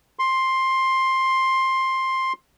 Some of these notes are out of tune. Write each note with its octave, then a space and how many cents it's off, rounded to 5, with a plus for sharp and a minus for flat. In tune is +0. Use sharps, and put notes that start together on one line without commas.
C6 +10